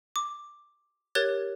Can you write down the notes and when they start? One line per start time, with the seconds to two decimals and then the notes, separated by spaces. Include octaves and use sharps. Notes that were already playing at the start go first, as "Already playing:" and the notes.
0.16 D6
1.15 G4 A#4 C#5 F#6 G#6 A6